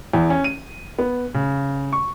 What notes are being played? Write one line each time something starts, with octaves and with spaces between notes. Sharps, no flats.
E2
C#4
D#7
B3
C#3
C#6